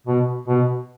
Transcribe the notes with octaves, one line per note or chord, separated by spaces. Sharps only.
B2
B2